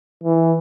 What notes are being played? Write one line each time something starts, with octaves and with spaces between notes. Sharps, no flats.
E3